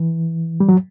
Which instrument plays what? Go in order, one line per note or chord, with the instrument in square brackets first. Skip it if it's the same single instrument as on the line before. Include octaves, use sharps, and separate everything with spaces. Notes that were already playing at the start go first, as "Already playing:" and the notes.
Already playing: [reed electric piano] E3
G3
F#3